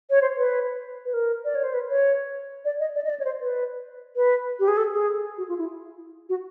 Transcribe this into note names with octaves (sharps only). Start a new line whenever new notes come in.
C#5
C5
B4
B4
A#4
D5
C#5
C5
B4
C#5
D5
D#5
D5
D#5
D5
C#5
C5
B4
B4
G4
G#4
A4
G#4
F#4
F4
E4
F#4